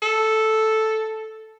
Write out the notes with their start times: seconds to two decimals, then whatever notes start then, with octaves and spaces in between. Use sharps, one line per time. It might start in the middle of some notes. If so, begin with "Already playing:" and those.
0.02 A4